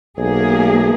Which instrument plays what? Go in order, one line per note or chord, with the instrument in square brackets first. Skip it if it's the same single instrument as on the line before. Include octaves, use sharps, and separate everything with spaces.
[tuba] B1 [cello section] A3 A#3 G#4